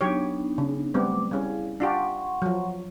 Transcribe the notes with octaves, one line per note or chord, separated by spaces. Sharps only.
F#3 B3 D4 D#4 G4 C#5
C#3
F#3 G3 A3 B3 C4 D6
G3 C#4 E4 G#4 F5
D4 F4 G4 F#5 C6 C#6
F3 F#3